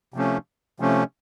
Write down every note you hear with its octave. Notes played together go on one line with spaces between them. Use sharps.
C3 F3 A3 C#4
C3 F3 A3 C#4